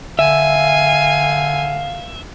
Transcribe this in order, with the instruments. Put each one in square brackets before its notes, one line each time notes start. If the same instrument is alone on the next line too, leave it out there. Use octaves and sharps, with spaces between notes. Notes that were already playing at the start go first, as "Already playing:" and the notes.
[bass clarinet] D3 [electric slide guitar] E5 [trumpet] F5 [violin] G#5